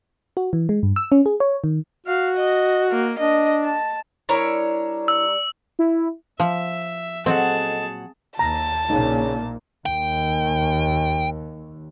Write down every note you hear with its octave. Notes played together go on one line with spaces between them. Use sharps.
F#4
E3
G#3
G2
E6
C#4
G#4
C#5
D#3
F#4 F5
D#5
A#3
D4 D#5
A5
G3 D4 E4 A#4 C#5
E6
E4
F3 E5
A#2 F#3 C4 G#4 A4 D#5 F#5 A5
D#2 A5 A#5
A#1 A#2 C#3 A#3 D#4
D#2 G5